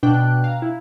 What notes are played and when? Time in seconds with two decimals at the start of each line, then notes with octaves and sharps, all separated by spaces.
0.03 B2 D4 G5 F#6
0.44 F5 A#5
0.62 E4